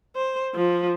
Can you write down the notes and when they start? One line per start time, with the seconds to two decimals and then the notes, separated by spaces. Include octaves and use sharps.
0.16 C5
0.55 F3